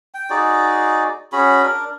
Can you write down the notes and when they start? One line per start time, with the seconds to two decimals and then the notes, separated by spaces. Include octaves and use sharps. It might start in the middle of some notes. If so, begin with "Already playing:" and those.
0.14 G5
0.30 D#4 F#4 G#4 D5
1.32 C#4 F#4 G#4 B5
1.63 D4 A#4